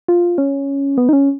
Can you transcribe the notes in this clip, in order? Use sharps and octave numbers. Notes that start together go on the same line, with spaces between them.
F4
C#4
B3
D#4
C#4